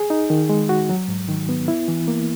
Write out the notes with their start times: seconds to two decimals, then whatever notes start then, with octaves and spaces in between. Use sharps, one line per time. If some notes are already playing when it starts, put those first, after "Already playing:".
Already playing: G#4
0.10 D#4
0.30 D#3
0.49 G#3
0.69 F#4
0.90 F#3
1.08 G#2
1.29 D#3
1.49 B3
1.68 E4
1.88 E3
2.08 A#3